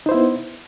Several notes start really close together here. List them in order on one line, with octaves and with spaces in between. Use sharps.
D#4 C5 E4 B3